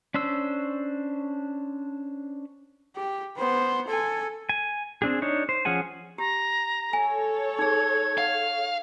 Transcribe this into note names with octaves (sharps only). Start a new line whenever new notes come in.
C#4 D4 C5 E6
G4
B3 C5
A4 G#5
G#5
C4 D4 G#4
D4 D#4 C#5
C5
F3 C#4 G#4 F#5 G#5
G4 A#5
A4 C#5 G#5
D#4 G#4 G#6
F5 F#5